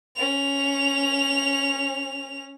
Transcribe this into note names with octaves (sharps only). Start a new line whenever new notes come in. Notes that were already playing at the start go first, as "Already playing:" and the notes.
C#4 F7